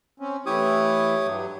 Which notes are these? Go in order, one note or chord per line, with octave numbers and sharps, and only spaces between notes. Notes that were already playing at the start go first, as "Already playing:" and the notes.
C4 C#4
E3 A3 E4 G4 C#5 D#6
G2 F#3